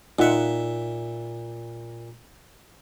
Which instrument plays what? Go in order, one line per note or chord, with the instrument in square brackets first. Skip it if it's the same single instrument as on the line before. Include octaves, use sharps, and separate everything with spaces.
[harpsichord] A#2 E5 [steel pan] D#4 F4 F#5